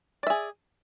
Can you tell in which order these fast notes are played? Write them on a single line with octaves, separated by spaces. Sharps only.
D5 E5 G#4